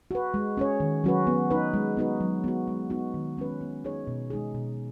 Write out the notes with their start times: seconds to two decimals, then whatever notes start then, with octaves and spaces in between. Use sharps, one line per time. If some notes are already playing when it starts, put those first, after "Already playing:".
0.11 F#4 B4
0.34 G#3
0.57 C#4 G#4 C#5
0.80 D#3
1.04 F#3 C#4 F#4 B4
1.27 B3
1.50 D#4 B4
1.74 G#3
1.97 B3 D#4 F#4 B4
2.20 F#3
2.44 B3 F#4
2.68 G#3
2.90 B3 D#4 F#4
3.14 D#3
3.38 G#3 C#4 B4
3.61 B3
3.85 D#4 G#4 C#5
4.07 B2
4.30 G#3 D#4 G#4
4.55 B2